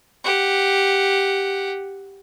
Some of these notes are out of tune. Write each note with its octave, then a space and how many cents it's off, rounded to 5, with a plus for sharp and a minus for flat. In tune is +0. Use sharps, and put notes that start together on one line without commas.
G4 +0 F#5 +0